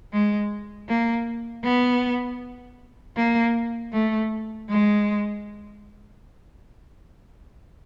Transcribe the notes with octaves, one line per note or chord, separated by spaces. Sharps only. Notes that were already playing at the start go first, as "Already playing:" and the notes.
G#3
A#3
B3
A#3
A3
G#3